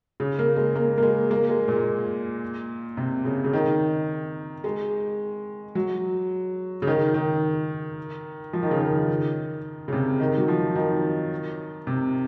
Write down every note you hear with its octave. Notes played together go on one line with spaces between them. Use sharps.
C#3
A#3
G#3
A#3
A#3
G#3
A#3
G#3
A#2
C3
C#3
C#3
D#3
G#3
F#3
C#3
D#3
D#3
F3
D#3
C#3
D#3
C#3
C3
D#3
F#3
F3
D#3
C3